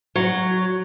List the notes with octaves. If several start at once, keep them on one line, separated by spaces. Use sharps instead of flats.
F#3